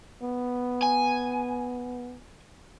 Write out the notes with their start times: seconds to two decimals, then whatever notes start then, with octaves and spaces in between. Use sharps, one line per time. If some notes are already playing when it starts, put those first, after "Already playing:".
0.22 B3
0.83 G#5